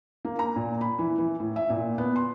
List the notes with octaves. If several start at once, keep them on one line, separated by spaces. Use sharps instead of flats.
A#3
A#5
A#2
B5
E3
E3
A2
E5
A#2
B3
C6